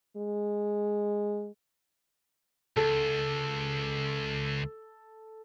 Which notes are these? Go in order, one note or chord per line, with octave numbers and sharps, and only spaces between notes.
G#3
C#2 A4